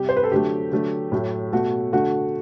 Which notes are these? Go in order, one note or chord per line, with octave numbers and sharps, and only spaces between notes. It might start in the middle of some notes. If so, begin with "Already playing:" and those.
Already playing: C3 G3 G4
C5
B4
A4
D3 F#3 A3 G4
D3 F#3 A3
A2 F#3 A3
B2 A3 F#4
D3 A3 F#4